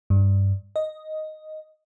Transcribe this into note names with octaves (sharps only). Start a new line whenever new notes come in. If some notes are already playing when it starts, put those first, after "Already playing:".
G2
D#5